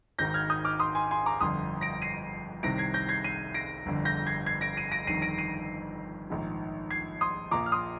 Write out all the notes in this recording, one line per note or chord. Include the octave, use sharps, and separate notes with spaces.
G#1 G#2 D#3 G6 A#6
F6 G#6
D#6 G6
D6 F6
C6 D#6
G#5 C6
G#5 C6
A#5 D6
G1 F2 D3 C6 D#6
A#6 D7
C7 D#7
C2 C3 D#3 A#6 D7
G#6 C7
G6 A#6
G#6 C7
C7 D#7
A#6 D7
G1 F2 D3
G6 A#6
G#6 C7
G#6 C7
A#6 D7
C7 D#7
A#6 D7
G1 F2 D#3 C7 D#7
A#6 D7
C7 D#7
A#1 G#2 D#3
G#6 C7
C6 D#6
A#1 A#2 A#5 D6
F6
C6 D#6